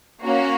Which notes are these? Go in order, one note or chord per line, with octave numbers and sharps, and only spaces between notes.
A#3 C#4 F#4